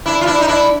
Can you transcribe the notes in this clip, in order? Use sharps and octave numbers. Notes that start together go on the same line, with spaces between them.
D4 E4
F4
D4 E4
D#4
D4 E4